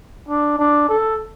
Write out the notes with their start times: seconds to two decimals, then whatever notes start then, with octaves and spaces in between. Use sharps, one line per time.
0.29 D4
0.59 D4
0.89 A4